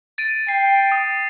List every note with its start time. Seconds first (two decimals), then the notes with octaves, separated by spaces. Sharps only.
0.18 A6 D7 D#7
0.48 G5 C7
0.92 D#6